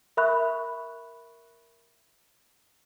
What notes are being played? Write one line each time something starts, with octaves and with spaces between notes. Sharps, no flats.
A#4 E5 B5 C#6 F#6